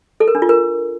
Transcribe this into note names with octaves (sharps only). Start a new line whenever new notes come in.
A4
A#4
D4
F4
A#4